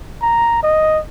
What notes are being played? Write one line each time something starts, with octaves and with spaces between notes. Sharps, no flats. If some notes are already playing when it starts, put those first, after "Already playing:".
A#5
D#5